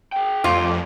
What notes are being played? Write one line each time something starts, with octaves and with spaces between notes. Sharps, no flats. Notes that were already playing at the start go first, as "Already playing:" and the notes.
G#4 G5
F2 G3 A3 F4 D6